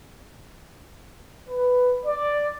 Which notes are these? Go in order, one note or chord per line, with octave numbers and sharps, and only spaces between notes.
B4
D5